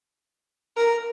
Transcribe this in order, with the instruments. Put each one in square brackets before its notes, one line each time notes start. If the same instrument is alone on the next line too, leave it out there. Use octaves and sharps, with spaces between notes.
[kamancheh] A#4